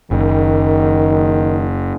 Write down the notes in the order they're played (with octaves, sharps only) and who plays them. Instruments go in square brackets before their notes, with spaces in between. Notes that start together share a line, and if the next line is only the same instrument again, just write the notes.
[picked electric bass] F#1 [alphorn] D#3